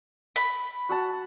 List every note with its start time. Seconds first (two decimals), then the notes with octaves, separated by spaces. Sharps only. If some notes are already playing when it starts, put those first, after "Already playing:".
0.36 B5
0.89 F#4 F#5 A5